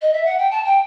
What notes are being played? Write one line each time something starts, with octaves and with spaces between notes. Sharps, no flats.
D#5
E5
F#5
G5
A5
G5